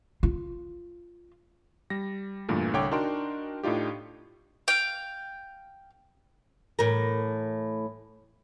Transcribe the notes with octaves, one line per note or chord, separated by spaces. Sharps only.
F4
G3 A#6
E2 G2 A#2 E3 A3
C2 D3 C#5 G5 D6
D4 D#4 F#4 A#4 G5 C6
A2 D4 D#4 F4 G4
F5 G5
A2 E3 A#4